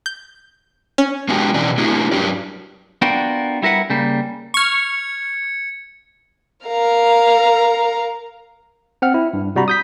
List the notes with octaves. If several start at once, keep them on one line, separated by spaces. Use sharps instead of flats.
G6
C#4
G#3 B3 D4 F#4 G4
B2 E3 C#4 D4 D5
A3 D4 E4 F#4 G4
G2 E3 F#3 D4 G4 D5
B3 D4 F4 F#4 A#4 G5
G3 E4 A#4 B4 F#5
C#3 G3 A#3
C#6 F6 G#6 C#7
A#4 F5 A#5
C4 F#5 F6
E4
G2
C3 G3 F#4 A#5 B5
D#6 G6 B6